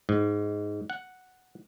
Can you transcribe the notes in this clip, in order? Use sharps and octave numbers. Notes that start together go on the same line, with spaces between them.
G#2
F#5